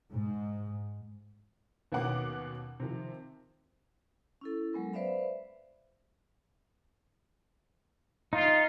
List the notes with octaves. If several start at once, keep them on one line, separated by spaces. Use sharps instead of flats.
G#2
D#2 B2 A#3 C#4 F#5 D6
C3 D#3 F3
C#4 E4 A4
F#3 G#3 B3 A#4
B4 C5 D5 E5 F5 B5
D#4 F4